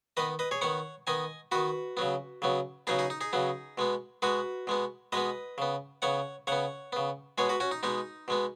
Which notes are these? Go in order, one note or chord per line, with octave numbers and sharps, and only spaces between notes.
D#3 B3 B4 D#5
B4 D#5
G#4 C#5
D#3 B3 C#5 F#5
D#3 B3 D#5 G#5
D#3 B3 F#4 B4
C#3 F#3 B3
C#3 F#3 B3
C#3 F#3 B3 D#4 G#4
D#4 G#4
D#4
D#4 G#4
C#3 F#3 B3
B2 G#3 B3
B2 G#3 B3 F#4 B4
B2 G#3 B3
B2 G#3 B3 B4 D#5
C#3 B3
C#3 B3 C#5 F#5
C#3 B3 C#5 F#5
C#3 B3
B2 G#3 B3 G#4 C#5
F#4 B4
C#4 F#4
D#4
B2 G#3 B3 D#4
B2 G#3 B3